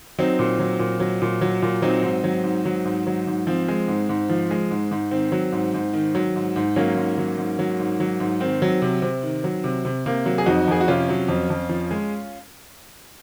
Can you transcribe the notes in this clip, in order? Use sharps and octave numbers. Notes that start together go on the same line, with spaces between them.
F#3 C4 D#4
A#2
F#3
A#2
F#3
A#2
F#3
A#2
F#3 C4 D#4
G#2
F#3
G#2
F#3
G#2
F#3
G#2
F3 C4
G#3
G#2
G#2
F3
G#3
G#2
G#2
D#3 C4
F#3
G#2
G#2
D#3
F#3
G#2
G#2
F#3 A#3 C#4
G#2
F#3
G#2
F#3
G#2
F#3
G#2
D#3 C4
F#3
C3
C3
D#3
F#3
C3
C3
C3 A#3
F#3
G#4
F2 D#4 F#4
F2 G#4
F#4
C3 C#4 F4
F#3
F2
F2
F3
G#3